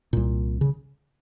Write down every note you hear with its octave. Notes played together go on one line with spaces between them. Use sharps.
C2 A#2
C#3